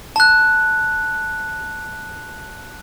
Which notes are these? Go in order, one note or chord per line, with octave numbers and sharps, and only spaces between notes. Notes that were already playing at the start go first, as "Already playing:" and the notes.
A5 F#6